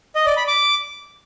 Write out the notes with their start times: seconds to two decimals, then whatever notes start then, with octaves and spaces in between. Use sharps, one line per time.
0.15 D#5
0.26 D5
0.37 B5
0.48 D6